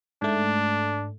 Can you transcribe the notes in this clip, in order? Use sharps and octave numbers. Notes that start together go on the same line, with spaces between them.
G#2 A3 D4